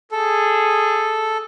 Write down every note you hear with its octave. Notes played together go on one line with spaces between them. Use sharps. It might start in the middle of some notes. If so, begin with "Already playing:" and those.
G#4 A4